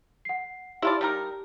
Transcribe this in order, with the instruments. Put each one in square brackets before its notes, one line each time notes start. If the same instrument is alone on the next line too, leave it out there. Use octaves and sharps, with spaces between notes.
[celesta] F#5 C7
[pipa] E4 F4 D5 [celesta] G4 A5
[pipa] G3 D#4 A#4